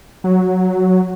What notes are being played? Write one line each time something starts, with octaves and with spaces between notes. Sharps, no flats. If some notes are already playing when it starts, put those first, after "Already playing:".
F#3